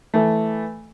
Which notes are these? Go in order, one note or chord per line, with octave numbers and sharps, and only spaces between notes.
E3 A3